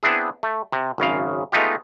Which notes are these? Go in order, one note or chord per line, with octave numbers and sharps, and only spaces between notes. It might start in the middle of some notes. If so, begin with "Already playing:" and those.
B3 C4 D4 E4 G#4
A3
C3
G#1 F#2 C#3 F5
G#3 A3 B3 D#4 F4 G4